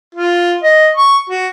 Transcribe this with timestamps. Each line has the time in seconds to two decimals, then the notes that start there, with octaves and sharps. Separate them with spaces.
0.15 F4
0.63 D#5
0.97 C#6
1.29 F#4